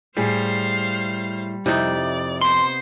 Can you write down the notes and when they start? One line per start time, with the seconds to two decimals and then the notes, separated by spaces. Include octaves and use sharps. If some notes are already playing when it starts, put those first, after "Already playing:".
0.17 A2 G3 G#4 C5 F5
1.66 F2 C3 D#4 E4 D5
2.41 B3 C5 C6